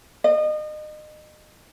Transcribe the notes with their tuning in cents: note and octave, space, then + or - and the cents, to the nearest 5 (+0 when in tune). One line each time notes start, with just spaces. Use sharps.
D#5 -30